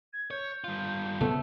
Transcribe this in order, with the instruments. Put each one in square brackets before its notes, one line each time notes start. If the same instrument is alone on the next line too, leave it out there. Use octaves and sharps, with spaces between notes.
[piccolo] G#6
[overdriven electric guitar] C#5 [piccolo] G6
[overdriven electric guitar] G2 F4
[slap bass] C#3 B3 C4 [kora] A3